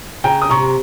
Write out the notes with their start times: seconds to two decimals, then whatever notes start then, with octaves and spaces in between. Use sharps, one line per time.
0.24 C#3 G5 A#5
0.42 D#6
0.50 C3 A#5 C#6